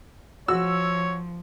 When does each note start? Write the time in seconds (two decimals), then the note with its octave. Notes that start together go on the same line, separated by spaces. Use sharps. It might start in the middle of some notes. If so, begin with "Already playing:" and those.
0.48 F3 F#4 C#5 E6